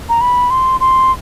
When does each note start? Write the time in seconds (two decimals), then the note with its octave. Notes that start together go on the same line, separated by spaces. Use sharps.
0.09 A#5
0.21 B5
0.50 C6
0.80 C6